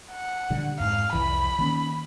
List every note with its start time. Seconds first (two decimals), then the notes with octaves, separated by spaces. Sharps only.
0.13 F#5
0.50 A#2 D3 G3
0.80 F2 G#2 F5
1.13 C2 F2 E3 B5
1.59 D#3 A#3 C#4